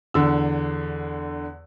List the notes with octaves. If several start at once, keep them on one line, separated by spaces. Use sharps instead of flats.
E2 D3 E6